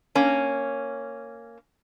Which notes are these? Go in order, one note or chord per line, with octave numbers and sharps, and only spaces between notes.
A#3 C#4